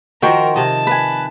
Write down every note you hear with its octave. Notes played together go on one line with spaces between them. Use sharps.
D#3 F3 F#4 A#4 G5 C6
C3 D#5 A5
B4 G#5